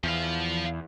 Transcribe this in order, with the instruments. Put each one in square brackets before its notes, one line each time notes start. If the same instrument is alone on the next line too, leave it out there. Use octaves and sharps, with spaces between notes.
[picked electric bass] E2 [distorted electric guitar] F3 F5